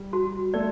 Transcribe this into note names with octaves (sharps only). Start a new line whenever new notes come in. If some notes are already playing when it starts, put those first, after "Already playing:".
Already playing: G3
F#4
A3 A4 D5